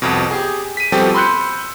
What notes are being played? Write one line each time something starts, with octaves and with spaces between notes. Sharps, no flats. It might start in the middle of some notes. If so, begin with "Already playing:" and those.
C2 F2 B2
G4 G#4
B6 D#7
B2 F3 G3 C4 G4 A4
B5 C6 E6 F#6 G6 C#7